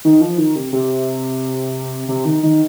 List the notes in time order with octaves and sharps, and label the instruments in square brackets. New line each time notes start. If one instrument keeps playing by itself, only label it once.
[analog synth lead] D#3
F3
D#3
C3
C3
C3
D#3
D#3